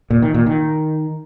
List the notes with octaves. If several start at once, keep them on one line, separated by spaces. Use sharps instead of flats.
A#2
D#3
A#2
D#3